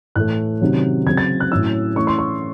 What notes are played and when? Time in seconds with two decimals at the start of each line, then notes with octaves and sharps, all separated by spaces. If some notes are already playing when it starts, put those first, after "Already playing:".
0.16 A2 E3 A3 F#6
0.61 C3 D#3 F#3 C#4
1.06 C#3 F#3 C4 G#6
1.17 A6
1.40 F#6
1.51 A2 F#3 C#4 E4 E6
1.96 E3 A3 C#4 E4 C#6
2.07 C6
2.19 C#6